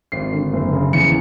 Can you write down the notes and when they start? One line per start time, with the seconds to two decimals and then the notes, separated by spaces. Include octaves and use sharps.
0.12 G#1 C7
0.32 D3
0.53 F#1
0.73 C#3
0.93 E2 C#7